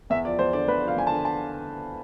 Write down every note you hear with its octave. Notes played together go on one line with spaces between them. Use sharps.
E2 E5
F3 D5
E2 C5
D3 D5
E2 B4
F3
F5
E2 G#5
A5
D3
A5